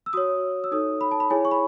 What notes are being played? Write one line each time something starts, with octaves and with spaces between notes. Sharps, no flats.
E6
F#4 C#5 D#6
E6
D#4 A4 C#5 D#6
B5
A5
B5
E4 G#4 C#5 G#5
C#6
B5